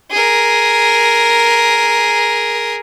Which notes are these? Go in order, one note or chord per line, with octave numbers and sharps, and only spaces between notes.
G#4 A#4